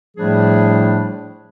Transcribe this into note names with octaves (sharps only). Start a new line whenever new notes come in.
A2 F3 G3 A3 D4 G#4